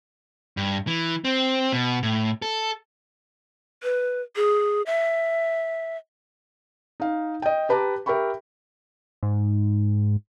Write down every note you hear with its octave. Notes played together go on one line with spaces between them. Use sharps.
G2
E3
C4
B2
A2
A4
B4
G#4
E5
D#4 F5
D#5 G5
G4 B4 A5 A#5 D6
G4 A#4 E5 G5 B5 C#6
G#2